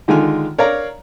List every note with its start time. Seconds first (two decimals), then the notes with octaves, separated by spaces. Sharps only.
0.08 D3 D#3 G#3 F4 G#5 F6
0.58 A#4 C#5 D5 F5 A#5